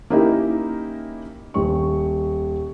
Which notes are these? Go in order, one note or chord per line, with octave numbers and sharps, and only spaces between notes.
A#3 C#4 D#4 E4 G4 A#4
D#1 C#6